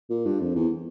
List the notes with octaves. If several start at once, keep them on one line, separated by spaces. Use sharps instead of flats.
A#2
G2
F2
E2